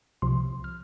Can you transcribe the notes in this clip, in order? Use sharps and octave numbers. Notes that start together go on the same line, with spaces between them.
C2 C3 F3 C6
F6